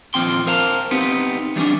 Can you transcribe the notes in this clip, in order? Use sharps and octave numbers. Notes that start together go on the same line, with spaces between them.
D#2 A#2 F3 C4 G5 C6
A#4 C5 F5 A5 A#5
B3 C4 D#4 G4
E3 G3 A#3 C#4 D4